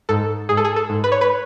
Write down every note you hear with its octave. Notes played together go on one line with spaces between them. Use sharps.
G#2 A4
G#2 G#4
A4
G#4
A4
G#2
B4
C#5
B4